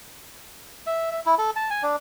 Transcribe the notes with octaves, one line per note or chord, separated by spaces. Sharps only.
E5
E5
E4
A4
A5
G#5
D4